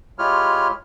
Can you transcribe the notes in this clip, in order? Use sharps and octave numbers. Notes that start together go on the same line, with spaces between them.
G#3 E4 F4 G4 C#5 F6